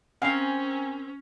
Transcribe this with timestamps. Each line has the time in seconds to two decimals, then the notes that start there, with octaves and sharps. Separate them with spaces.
0.22 C4 C#4 A#4 F5 G#5